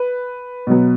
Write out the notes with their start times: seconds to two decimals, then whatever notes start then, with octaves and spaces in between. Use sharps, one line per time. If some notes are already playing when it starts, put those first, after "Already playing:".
Already playing: B4
0.67 B2 F#3 B3